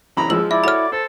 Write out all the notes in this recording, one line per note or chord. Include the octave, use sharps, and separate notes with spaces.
F#2 C#3 E3 A#5 B5
F3 G#3 E6 F#7
E4 D5 E5
F#4 A4 C#5 B5 F6
A4 C5